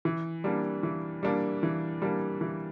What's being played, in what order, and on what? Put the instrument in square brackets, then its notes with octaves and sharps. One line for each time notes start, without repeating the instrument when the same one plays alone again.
[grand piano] E3
G3 A#3 D4
E3
G3 A#3 D4
E3
G3 A#3 D4
E3